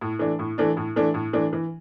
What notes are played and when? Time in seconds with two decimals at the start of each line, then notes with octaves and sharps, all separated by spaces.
0.01 A2
0.19 E3 A3 D4
0.39 A2
0.58 E3 A3 D4
0.77 A2
0.96 E3 A3 D4
1.14 A2
1.33 E3 A3 D4
1.53 E3